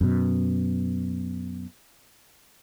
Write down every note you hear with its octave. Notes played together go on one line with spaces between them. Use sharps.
F#2 B2